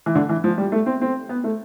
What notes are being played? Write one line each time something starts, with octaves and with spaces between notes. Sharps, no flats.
E3
D3
E3
F3
G3
A3
C4
C4
B3
A3